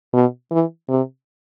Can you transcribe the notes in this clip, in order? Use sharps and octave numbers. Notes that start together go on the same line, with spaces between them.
B2
E3
C3